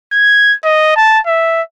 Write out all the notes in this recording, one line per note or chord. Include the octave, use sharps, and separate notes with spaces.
G#6
D#5
A5
E5